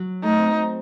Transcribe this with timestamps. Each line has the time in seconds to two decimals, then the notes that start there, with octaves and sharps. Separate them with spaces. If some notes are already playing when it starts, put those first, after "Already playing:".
Already playing: F#3
0.23 A3 D#4
0.38 C4
0.53 C4